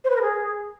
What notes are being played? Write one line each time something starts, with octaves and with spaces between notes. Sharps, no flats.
C5
B4
A#4
G#4